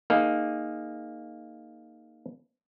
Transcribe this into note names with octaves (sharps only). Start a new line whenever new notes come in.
A#3 D#4 G#4